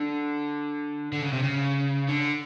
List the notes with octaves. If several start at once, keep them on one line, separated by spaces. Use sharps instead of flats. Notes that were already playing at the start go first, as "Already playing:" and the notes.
Already playing: D3
D3
C#3
C3
C#3
D3